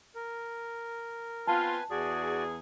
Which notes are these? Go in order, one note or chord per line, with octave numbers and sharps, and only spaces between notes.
A#4
B3 C4 F4 B4 G#5 A5
E2 F#4 G#4 D5